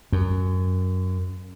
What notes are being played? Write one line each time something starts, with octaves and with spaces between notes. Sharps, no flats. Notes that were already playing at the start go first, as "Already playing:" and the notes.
F#2